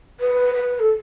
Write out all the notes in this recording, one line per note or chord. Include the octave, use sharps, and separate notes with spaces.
B4
B4
A4